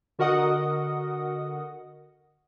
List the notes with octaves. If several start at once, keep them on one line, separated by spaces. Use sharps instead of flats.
D3 F#4 A#4 D#5 F#5 D#6